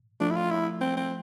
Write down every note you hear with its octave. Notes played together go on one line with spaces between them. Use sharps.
F3 A3 D4
E4
F4
E4
C4
C4